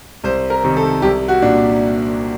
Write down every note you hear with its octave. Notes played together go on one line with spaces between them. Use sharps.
C2 C5
A#4
C3 D#3
A4
C2 G4
F#4
A#2 D4